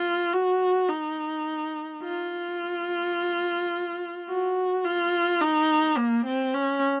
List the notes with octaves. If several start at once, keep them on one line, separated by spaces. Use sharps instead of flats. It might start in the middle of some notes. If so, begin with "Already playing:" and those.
Already playing: F4
F#4
D#4
F4
F#4
F4
D#4
A#3
C4
C#4